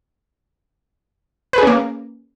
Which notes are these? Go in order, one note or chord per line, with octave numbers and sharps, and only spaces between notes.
A#3 C#4 G#4 B4